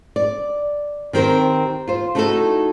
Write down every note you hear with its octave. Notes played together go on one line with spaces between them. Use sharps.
D5
D#3 C4 G4 A#4 C5
F4 C5
A3 D#4 E4 F#4 G4 A4